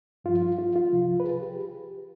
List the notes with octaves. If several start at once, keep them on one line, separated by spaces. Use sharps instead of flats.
G2 F3 F4
F4
F4
F4
C2 C3 F3
B4
G#4
G4